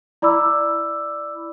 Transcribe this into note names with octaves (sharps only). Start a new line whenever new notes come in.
E4 D5 B5 D6 E6